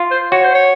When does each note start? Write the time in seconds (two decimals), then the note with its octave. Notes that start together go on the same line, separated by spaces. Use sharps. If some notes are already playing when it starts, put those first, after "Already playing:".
Already playing: F4
0.11 C5
0.32 F#4 C#5
0.43 C5
0.54 C#5